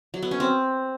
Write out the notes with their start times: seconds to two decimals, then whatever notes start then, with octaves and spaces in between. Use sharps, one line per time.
0.14 F#3
0.23 B3
0.31 C#4
0.40 C4